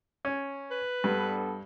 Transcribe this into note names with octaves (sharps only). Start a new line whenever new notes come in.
C#4
B4
G2 B3 D4 A4